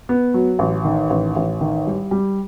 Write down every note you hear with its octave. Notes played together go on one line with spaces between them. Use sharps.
B3
F#3
A1
D#3
A1
A1
D#3
G3
G3